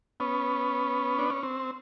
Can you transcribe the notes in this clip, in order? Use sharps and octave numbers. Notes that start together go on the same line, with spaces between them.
B3 C#4
D4
C#4
C4